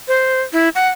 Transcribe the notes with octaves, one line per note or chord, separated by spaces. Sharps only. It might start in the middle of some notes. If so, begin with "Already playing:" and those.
C5
E4
F#5